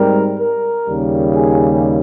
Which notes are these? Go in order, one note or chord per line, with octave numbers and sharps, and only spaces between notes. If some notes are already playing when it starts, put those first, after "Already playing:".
Already playing: G#2 G3 C4 A#4
A#4
D#2 C#3 G3
G#4